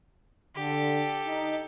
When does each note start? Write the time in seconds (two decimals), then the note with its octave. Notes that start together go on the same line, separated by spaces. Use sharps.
0.56 D3 G4 A4
1.26 D#4